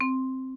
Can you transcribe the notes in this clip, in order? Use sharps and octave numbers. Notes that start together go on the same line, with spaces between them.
C4